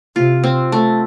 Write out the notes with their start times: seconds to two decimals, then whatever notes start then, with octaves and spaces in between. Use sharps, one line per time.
0.15 C3 F4
0.44 C4
0.72 A3